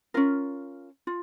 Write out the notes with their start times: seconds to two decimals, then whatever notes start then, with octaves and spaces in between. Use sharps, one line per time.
0.14 C#4 F4 A#4
1.07 F4